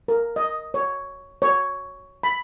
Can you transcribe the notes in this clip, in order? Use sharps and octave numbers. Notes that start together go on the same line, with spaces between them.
A#4
D#5
C#5
C#5
B5